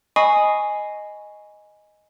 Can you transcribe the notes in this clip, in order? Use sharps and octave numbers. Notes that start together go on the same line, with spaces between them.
D#5 G#5 B5 C#6 D#6 C7